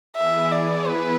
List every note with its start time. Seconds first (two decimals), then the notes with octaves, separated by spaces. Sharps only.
0.15 E3 B3 E4 G#4 E5
0.52 D5
0.88 B4